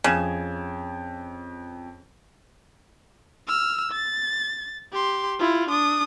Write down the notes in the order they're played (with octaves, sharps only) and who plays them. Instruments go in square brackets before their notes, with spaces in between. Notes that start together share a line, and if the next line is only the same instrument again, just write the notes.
[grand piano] F2 G#6 E7 [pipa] C#3
[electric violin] E6 F6
A6
G4 C6
E4 F4
D4 D#6